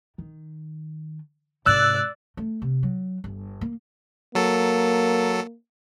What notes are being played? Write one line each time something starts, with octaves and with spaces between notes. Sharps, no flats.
D#3
G#2 C3 D5 E6 F#6
A3
C3
F#3
G1
A#3
F#3 A#3 A4